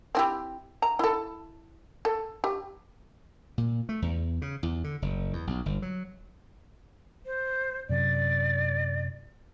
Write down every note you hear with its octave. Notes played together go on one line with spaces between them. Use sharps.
C4 E4 G4
A#5
E4 A4
A4
G4
A#2
A3
E2
C#3
E2
D3
F#1
E2
B1
G1
F#3
C5
F#2 C3 F#3 D5